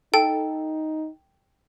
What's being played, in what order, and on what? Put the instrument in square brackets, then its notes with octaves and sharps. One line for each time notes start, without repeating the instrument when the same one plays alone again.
[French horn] D#4 [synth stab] A4 [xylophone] G5